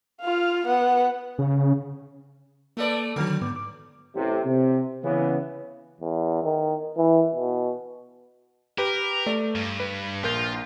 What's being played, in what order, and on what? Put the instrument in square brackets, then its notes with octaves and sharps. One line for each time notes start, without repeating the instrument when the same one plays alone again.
[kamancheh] F4 F5
B3 F#5
[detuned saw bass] C#3
[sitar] A3 A4 D5 [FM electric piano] A#3 B4
[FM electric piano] D3 D#3 F#3 [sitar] A3
[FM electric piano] G#2 B3 D6
D6
[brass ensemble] A1 C3
C3
C#3 E3 B3
[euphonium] E2
D#3
E3
B2
[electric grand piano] G4 B4 [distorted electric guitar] A#4
[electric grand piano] A3 D5
[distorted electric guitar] G2
[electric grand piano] B4
[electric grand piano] A#1 A#4 G6 [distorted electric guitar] F4